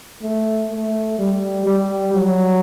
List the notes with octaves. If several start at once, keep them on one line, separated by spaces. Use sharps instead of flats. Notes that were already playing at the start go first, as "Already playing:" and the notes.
A3
A3
G3
G3
F#3